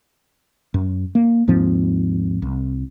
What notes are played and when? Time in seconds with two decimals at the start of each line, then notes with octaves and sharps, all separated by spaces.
0.74 F#2
1.15 A#3
1.48 D#2 G#2 F3 C4
2.42 C2